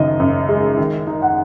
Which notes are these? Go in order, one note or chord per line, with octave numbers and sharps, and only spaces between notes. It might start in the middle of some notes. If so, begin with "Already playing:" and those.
Already playing: F#1 F#2 D#3 D#5
F#2
G#3
D#3
D#4
F#5